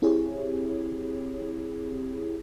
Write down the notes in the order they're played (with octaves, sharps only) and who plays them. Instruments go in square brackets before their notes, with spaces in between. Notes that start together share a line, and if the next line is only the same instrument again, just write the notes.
[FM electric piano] C4 E4 G4 G#4 C#5